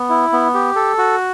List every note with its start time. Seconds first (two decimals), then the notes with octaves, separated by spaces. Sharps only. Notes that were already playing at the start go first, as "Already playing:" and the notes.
Already playing: B3
0.10 E4
0.33 B3
0.54 G4
0.76 A4
0.98 F#4